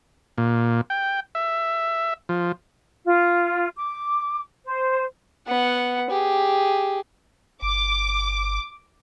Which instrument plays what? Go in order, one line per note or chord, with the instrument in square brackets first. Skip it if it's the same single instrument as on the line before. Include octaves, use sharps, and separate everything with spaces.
[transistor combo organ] A#2
G5
E5
F3
[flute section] F4
D6
C5
[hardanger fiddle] B3 F#5
G4 G#4
[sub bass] G1 [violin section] D6